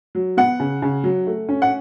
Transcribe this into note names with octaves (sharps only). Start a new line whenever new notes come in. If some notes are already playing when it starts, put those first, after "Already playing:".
F#3
B3 F#5
C#3
C#3
F#3
A3
C#4
F#5